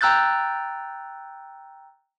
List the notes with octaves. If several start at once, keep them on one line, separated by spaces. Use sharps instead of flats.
G5 A#5 E6 F#6 G6 A6